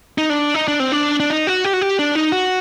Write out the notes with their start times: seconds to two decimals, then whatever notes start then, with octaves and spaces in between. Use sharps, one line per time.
0.18 D#4
0.30 D4
0.54 D#4
0.68 D4
0.80 C4
0.92 D4
1.20 D4
1.30 D#4
1.47 F#4
1.65 G4
1.73 F#4
1.81 G4
1.99 D4
2.15 D#4
2.32 F#4